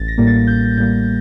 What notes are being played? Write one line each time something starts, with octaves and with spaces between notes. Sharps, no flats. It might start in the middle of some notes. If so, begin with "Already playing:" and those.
Already playing: A1 A6
A#6
A2 G3 A#3
A6
A1 G6
A2 G3 A#3 G6